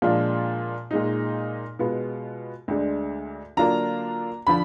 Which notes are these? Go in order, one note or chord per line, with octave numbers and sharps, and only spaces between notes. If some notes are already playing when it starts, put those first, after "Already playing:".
A#2 F3 G#3 D4 F4
A#2 G#3 D#4
B2 G#3 B3 F4
D2 D3 G#3 D4
D3 F#3 A#3 D4 F4 A#5
D3 F3 B5